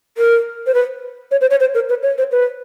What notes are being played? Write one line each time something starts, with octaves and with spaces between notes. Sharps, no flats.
A#4
C5
B4
C#5
C5
C#5
C5
A#4
B4
C#5
C5
B4